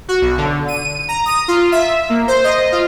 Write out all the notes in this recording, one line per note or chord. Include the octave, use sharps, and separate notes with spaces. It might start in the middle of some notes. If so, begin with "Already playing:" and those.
F#4
B1
D3
D#7
A#5
D#6
F4
E5
A#3
C5
D#5
F4